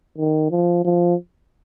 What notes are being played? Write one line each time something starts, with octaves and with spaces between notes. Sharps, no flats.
D#3
F3
F3